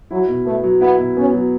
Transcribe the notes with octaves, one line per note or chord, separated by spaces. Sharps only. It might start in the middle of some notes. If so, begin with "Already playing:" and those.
F#3 E4
B2
A3 B3
F#3
B3 E4
B2
B3 C#4
F#3